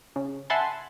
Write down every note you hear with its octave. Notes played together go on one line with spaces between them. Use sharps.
C#3
E5 F#5 G#5 A5 B5 C6